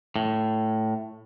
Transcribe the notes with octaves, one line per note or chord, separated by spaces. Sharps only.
A2